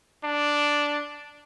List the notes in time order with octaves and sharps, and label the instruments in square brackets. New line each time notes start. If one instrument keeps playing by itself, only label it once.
[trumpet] D4